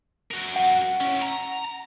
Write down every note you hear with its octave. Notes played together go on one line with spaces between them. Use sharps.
F#4 A#4
F#5
C#4 E4
A#5